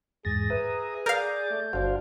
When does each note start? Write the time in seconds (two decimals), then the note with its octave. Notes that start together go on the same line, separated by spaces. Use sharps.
0.25 E2 G#2 G#4 A6 A#6
0.50 B4 E5 A#5 D#6
1.06 A#4 D5 F5 G6 A6
1.51 A3
1.73 G1 D4 F#4 C5 F5